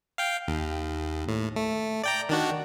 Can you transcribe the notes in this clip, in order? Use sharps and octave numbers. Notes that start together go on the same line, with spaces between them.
F5 G5
D#2
A2
A3
D5 G5 A#5
D#3 D4 F#4